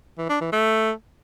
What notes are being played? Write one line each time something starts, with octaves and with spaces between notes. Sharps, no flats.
E3
D4
E3
A3